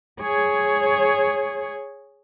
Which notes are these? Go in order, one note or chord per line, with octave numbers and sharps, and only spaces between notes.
G#4 C#5